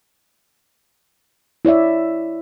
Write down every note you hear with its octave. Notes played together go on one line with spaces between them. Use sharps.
E4 C#5 D5 E5